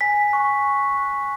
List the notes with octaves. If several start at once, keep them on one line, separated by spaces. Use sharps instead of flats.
G#5 B6
C#6 F#6
G#5
C#6 F#6